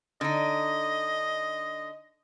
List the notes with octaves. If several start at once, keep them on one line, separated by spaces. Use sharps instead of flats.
D3 D#4 D#5